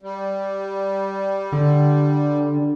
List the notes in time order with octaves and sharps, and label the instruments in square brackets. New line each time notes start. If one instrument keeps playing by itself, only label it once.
[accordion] G3
[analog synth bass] D3